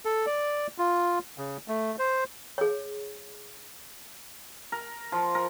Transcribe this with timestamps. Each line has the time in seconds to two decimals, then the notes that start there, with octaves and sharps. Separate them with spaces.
0.05 A4
0.26 D5
0.78 F4
1.38 C#3
1.68 A3
1.99 C5
2.58 G#4 C#5
4.72 A#4
5.12 F3
5.35 A#4